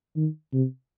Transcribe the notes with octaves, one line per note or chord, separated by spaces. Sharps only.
D#3
C3